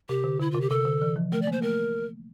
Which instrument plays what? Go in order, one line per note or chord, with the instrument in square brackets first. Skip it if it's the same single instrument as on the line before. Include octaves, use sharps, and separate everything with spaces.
[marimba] C3 [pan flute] G4
[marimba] D3
[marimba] D3 [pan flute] E4
[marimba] C3 [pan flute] F4
[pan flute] G4
[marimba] C3 [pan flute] A4
[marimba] D3
E3
F3
[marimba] A3 [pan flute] A#4
[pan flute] D5
[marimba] A#3
[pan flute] C5
[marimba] A3 [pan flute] A#4